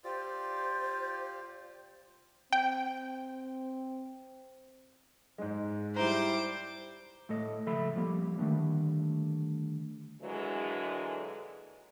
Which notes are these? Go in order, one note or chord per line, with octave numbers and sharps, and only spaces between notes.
F4 G4 C5 D5
C4 G5
G#2 G#3
G3 E4 C5 A#5 D6
A2 A3 A4 D#5
C#2 F3 A4 E5 B5
F3 G3 A#3
D3 D#3 G3 A3
A#2 D3 E3 F#3 G#3